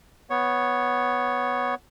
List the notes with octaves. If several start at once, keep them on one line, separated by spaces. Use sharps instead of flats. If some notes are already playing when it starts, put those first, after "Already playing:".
B3 C#5